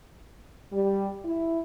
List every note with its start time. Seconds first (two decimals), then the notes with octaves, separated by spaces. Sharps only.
0.72 G3
1.25 E4